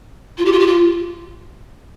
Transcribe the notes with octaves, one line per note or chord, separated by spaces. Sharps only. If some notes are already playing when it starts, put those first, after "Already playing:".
F4
G4
F4
G4
F4